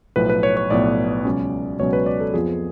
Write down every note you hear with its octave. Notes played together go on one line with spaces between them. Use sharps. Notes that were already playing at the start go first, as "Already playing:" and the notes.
B1 A2 F3 B3 B4
B4
C#5
C#5
B1 A2 F3 B3 D5
C#2 B2 F#3 C#4
C#2 B2 F#3 C#4 C#5
B4
D5
A4
F2 F3 B3 F4 G#4